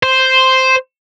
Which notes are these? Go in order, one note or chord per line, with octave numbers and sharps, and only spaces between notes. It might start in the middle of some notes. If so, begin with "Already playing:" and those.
C5